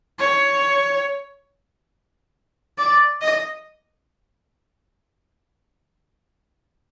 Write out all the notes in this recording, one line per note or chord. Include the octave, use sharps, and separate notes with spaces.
C#5
D5
D#5